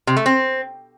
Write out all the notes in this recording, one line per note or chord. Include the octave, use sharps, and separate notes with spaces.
C3
A3
C4